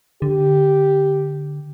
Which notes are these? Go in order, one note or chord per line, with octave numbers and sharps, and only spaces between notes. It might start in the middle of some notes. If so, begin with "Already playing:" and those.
D3 G4